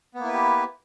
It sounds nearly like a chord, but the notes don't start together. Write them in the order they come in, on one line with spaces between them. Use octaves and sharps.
B3 A#3 E4 B4 G4